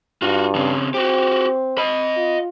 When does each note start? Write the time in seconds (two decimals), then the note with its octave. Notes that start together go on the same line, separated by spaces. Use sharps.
0.22 G2 F4 F#4
0.55 C#3 C4
0.94 C4 F#4 G4
1.78 D#5 B5
2.16 F4